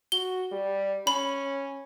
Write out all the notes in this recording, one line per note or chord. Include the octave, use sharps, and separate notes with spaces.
F#4 G7
G3
C#4 B5